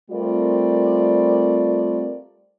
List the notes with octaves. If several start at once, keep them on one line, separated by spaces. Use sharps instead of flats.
G3 A3 C4 F4 A#4 D5